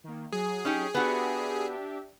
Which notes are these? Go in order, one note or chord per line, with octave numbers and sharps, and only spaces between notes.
D#3 A#3
F#3 G#4
C#4 D#4 G4
B3 D4 F#4 G4 E5